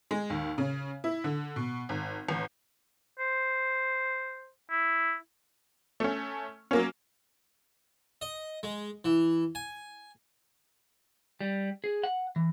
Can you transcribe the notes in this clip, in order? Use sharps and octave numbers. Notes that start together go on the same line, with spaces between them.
G#3
D#2
C#3
E4
D3
B2
G#1
A1
C5
E4
A3 C#4
F#3 A#3 C#4
D#5
G#3
E3
G#5
G3
G#4
F#5
E3